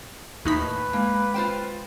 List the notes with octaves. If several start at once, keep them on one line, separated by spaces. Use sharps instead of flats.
D#2 A2 D#4 B4 B5
G#3 A#3
F4 C5 G5